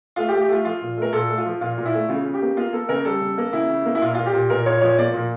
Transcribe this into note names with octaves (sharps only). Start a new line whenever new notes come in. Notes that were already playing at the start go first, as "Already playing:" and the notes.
A3 F4
G4
A3
G4
A3 F4
F3 F4
A#2
A3 A#4
A#2 A4
A3
F4
F3
A#2 F4
A#2
E4
A3
C#3 F4
C#3
G4
A#3
A#3 F4
A#3 A4
C#3 A#4
G3 A4
C#3
A#3
C#3 E4
C#3
A#3
E4
A#2 F4
A#2 F4
G4
A#2
A#2 A#4
A#2 C#5
F3 C#5
A#3 D5
A#2